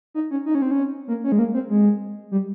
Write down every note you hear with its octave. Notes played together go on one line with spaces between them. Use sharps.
D#4
C#4
D#4
C#4
C4
C#4
A#3
C#4
G#3
A#3
C4
G#3
G3